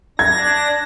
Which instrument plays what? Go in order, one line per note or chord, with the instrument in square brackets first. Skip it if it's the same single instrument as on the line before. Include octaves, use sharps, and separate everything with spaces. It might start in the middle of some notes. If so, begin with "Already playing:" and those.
[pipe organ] D4 A#6 [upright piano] G#6